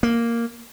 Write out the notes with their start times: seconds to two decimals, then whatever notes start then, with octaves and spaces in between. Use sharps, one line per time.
0.03 A#3